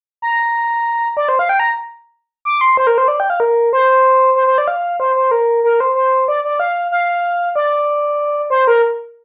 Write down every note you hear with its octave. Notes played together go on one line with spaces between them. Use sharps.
A#5
D5
C5
F5
G5
A#5
D6
C6
C5
A#4
C5
D5
G5
F5
A#4
C5
C5
C5
D5
F5
C5
C5
A#4
A#4
C5
C5
D5
D5
F5
F5
D5
C5
A#4